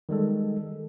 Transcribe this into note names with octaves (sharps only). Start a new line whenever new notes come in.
D#3 G3 G#3 A4